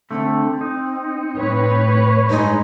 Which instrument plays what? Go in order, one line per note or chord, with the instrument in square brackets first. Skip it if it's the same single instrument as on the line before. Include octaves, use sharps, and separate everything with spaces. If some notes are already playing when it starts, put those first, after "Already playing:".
[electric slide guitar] D3 A3 [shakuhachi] C4
[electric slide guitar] D#4
[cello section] A2 B4 C#5
[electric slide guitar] G2 G#3 [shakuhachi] D#4